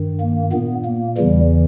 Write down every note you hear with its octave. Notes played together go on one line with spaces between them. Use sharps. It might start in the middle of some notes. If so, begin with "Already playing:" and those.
Already playing: G2 D#3
A#3
A#2 B3
A#3
E2 C#3 E3 G3